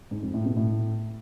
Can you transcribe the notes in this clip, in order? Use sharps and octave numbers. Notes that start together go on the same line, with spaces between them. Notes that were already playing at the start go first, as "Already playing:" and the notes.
G#2
F2
A2
B2
A2